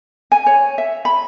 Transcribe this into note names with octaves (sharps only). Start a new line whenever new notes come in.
G#5
C#5
E5
B5